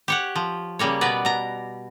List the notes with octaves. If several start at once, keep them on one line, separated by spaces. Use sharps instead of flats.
G4 C#5 F#5
F3
C#3 G3 A#3 C#5
B2 B3 A#4 B4 D5
B2 A#5